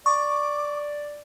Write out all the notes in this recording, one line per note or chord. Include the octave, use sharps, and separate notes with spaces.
D5 C#6 D6